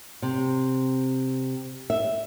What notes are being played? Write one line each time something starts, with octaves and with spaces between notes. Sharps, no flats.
C3
E5